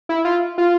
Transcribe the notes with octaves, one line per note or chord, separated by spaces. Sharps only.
E4
F4
F4